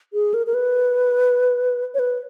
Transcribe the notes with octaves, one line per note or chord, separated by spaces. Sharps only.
G#4
A#4
A#4
B4
C#5
B4